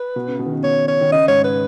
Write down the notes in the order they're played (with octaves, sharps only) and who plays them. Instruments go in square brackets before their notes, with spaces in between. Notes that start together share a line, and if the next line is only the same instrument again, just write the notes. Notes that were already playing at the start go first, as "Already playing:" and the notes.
Already playing: [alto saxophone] B4
[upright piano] B2
C#3
B2
D#3
C#3
[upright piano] B2 [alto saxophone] C#5
[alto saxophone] C#5
[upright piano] D#3
[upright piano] C#3 [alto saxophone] D#5
[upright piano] G#2 [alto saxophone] C#5
[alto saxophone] B4